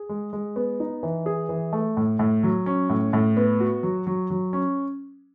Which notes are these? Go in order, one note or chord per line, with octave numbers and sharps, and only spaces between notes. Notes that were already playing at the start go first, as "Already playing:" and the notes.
Already playing: G#4
G#3
G#3
B3
D#4
E3
G#4
E3
A3
A2
A2
F#3
C#4
A2
A2
B3
F#4
F#3
F#3
F#3
C#4